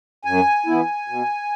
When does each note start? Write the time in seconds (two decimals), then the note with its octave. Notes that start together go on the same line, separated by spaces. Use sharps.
0.25 F#2 G#5
0.66 E3 B3 E4
1.08 B2